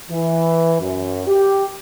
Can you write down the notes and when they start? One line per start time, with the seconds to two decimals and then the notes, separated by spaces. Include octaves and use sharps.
0.11 E3
0.81 F#2
1.28 G4